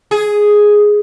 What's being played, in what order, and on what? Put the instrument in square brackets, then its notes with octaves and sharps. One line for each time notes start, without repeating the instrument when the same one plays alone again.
[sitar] G#4